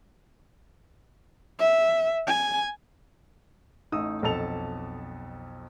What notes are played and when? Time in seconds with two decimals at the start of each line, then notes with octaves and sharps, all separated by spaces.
1.59 E5
2.27 G#5
3.92 A1 A3 D#4 D#6 E6
4.23 B1 F2 A4 A5 F7